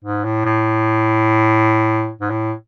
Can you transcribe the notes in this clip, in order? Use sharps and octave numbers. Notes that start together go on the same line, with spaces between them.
G#2
A2
A2
G#2
A2